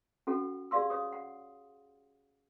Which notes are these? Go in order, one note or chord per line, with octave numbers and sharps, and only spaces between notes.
C#4 F#4 A4 F#5
G4 G#4 D5 F5 C6 E6
C#5 F5 D#6
F#5